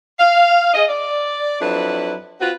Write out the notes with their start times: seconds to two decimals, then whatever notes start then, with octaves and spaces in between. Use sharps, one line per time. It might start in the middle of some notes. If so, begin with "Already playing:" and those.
0.20 F5
0.74 G#4 D#5
0.89 D5
1.61 F2 F#3 D4 E4 B4
2.41 C4 F4 F#4 B4